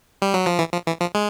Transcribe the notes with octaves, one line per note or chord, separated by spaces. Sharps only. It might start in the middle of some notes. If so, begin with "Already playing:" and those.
G3
F#3
F3
E3
F3
E3
F3
G#3